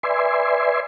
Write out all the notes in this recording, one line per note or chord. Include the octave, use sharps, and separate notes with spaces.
B4 D5 E5 G#5 C6